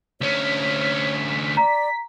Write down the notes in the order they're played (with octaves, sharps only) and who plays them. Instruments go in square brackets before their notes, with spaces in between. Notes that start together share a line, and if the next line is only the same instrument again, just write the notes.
[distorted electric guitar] D2 C#4 [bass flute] C#5 [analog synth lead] B6
[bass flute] D5 [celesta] A#5